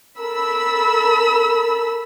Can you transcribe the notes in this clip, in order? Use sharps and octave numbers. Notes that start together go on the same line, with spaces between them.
A4 A#4 B5 E6